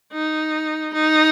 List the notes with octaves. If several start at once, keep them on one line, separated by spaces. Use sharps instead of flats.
D#4
D#4